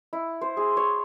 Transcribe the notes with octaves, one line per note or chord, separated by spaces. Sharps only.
E4
C5
G#4
C#5